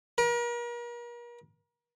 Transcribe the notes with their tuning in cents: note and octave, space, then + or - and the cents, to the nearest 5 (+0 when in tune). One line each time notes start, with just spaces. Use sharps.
A#4 +40